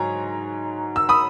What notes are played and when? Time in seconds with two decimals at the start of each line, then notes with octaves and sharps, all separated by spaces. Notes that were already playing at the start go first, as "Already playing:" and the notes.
Already playing: G#2 F#3 C#5 G#5 A#5
0.96 E6
1.09 B5 D#6